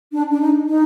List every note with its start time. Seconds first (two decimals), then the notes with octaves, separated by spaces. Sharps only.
0.13 D4
0.30 D4
0.40 D#4
0.67 D#4